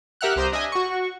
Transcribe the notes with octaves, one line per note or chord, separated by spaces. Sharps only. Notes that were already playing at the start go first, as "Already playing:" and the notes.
G4 A#4 E5 F#5 F6 F#6
C2 G4 C5 A#5 D#6 G6
D4 D#5 E5 G#5
F#4 C#6